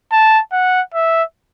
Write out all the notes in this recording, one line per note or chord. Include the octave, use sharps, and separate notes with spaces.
A5
F#5
E5